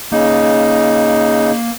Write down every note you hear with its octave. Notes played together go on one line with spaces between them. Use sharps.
C#3 A#3 D#4